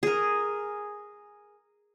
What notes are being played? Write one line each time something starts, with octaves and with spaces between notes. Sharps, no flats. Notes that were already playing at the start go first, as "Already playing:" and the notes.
G#4 A#4